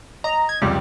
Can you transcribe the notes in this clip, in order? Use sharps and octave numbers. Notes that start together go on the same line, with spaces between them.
D#5 A#5
G#6
F1 C#2 G3 G4